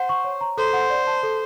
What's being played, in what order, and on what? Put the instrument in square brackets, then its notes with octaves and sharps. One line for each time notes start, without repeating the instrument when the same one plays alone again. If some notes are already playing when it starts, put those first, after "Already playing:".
Already playing: [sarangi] C5 [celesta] F#5
[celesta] C#6
C#5
A#5
[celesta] A4 [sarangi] C5
[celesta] F#5
D5
A5
A4